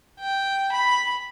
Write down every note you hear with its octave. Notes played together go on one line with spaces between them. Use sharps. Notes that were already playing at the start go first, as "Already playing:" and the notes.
G5
B5